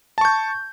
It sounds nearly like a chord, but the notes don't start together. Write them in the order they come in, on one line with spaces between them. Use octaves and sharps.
A5 C#6 G6